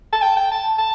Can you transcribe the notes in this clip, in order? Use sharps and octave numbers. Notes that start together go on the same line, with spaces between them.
A5
G5
G5
A5
A5